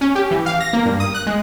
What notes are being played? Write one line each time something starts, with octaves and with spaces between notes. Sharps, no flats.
C#4
G4
E3
F5
A#6
A#3
G2
D#6
F#6
G#3